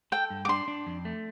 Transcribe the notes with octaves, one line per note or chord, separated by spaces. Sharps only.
A4 G5
G2
D6
D4 C6
D4
F2
A3